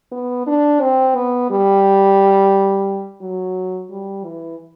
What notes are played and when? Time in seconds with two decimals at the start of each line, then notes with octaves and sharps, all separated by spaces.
0.11 B3
0.47 D4
0.81 C4
1.15 B3
1.50 G3
3.21 F#3
3.91 G3
4.25 E3